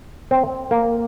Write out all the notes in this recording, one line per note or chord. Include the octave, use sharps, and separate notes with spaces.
C4
A#3